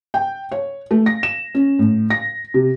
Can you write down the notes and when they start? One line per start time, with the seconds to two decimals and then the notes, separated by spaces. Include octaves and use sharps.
0.14 G5
0.52 C#5
0.91 A3
1.06 A#6
1.23 E7
1.55 C#4
1.79 A2
2.10 A#6
2.54 C3